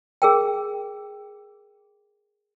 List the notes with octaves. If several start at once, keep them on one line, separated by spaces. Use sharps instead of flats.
G#4 A#4 G5